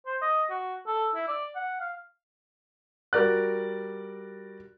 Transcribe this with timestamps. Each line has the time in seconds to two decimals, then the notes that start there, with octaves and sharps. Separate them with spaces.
0.06 C5
0.21 D#5
0.50 F#4
0.87 A4
1.15 E4
1.28 D5
1.55 F#5
1.80 F5
3.13 G3 F#4 A#4 D5 F#6